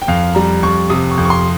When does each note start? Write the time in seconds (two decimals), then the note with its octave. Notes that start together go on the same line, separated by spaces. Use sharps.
0.02 G5
0.08 F2 F5
0.35 G3 A#5
0.63 F2 C#6
0.90 C3 D#6
1.11 C#6
1.18 F2
1.25 C#6
1.30 C6